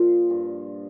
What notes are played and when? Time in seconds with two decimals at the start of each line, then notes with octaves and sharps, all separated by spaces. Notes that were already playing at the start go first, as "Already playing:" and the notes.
Already playing: A#2 F3 F4
0.30 G2